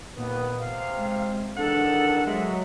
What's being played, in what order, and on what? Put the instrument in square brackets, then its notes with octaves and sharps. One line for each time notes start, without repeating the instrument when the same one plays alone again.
[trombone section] D#2 B3 [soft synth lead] A#2
[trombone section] C3 [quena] F5
[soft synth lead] G#3
[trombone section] E2 D#3 [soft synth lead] D4 [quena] A4 [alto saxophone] F#5
[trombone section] F#3 [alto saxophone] G#3 [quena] E5